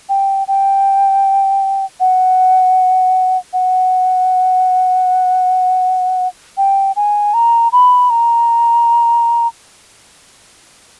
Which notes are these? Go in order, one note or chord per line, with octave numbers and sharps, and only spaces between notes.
G5
G5
F#5
F#5
G5
G#5
A#5
B5
A#5